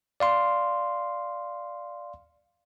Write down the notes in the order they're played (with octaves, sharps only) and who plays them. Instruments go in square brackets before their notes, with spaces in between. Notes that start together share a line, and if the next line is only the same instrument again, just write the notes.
[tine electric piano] D5 F5 C6